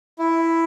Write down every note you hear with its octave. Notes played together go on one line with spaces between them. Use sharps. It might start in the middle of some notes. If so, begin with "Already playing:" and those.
E4